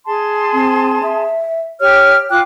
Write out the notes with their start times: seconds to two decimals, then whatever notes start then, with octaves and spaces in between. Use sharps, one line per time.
0.06 G#4 A5 C6
0.53 C4
1.03 E5
1.80 G4 C#5 F6
2.30 F4 G5 D6 F#6